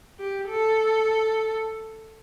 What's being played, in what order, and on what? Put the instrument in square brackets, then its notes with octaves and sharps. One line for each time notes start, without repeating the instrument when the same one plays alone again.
[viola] G4
A4